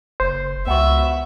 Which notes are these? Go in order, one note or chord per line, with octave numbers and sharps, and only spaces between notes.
F#1 C5
C#2 B3 F#4 E5